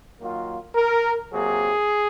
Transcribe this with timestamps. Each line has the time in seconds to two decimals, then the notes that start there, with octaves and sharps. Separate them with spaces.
0.19 D#3 F#3 A#3 F4
0.75 A#4
1.31 C3 F#3 A#3 G#4